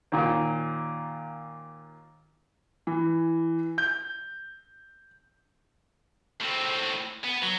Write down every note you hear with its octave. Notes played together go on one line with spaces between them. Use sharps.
D#2 A#2
E3
G6
A2 C4
B3
F#3